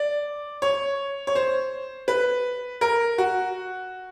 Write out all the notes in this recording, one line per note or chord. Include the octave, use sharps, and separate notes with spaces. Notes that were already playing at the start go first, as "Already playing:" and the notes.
Already playing: D5
C#5
C#5
C5
B4
A#4
F#4